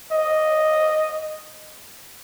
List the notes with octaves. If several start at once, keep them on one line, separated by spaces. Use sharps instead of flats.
D#5